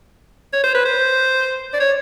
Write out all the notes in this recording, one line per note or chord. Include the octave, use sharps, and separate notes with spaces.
C#5
C5
B4
C5
D5
C#5